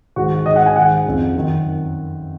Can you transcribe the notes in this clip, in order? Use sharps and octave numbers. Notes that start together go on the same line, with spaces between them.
G#2 D#3 F#4
G#2 D#3 D#5
F#5
G#5
G#2 D#3 F#5
F2 C#3
F#2 D#3